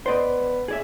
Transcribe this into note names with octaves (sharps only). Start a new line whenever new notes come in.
B3 C5 D5 D#5
G#4 D5 E5